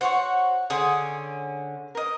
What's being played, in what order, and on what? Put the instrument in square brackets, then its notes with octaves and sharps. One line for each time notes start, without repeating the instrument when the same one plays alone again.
[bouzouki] F#4 [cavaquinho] C5 C#5 C#6
[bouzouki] D3 C#4 [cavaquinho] G#4 C6 D#6
[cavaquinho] A#4 D#5